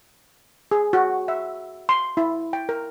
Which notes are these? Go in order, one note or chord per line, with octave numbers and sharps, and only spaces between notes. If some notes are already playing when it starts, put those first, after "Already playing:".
G#4
F#4
E5
C6
E4
G5
A#4